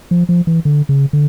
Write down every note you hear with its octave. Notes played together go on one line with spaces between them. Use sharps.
F3
F3
E3
D3
C#3
D3